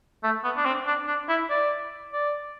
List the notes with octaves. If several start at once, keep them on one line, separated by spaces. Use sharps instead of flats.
A3
B3
D4
C4
D4
D4
E4
D5
D5